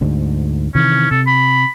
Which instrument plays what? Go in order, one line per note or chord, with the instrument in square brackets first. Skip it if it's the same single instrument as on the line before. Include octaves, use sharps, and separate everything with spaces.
[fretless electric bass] D2 G#2 D3
[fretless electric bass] C3 D#3 E3 [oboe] C#4
[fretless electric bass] C3 [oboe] A4
[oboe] B5